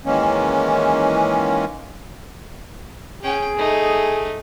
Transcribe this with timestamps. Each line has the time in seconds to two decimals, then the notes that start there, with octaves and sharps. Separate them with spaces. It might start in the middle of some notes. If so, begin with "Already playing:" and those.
0.05 D#3 E3 G#3 A#3 C#4
3.23 C#4 G#4 G5
3.57 A3 D#4